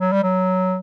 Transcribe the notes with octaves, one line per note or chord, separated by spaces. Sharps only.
F#3
G3
F#3